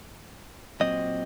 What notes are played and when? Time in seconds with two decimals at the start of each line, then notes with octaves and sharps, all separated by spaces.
0.80 A#2 F#3 C4 D#5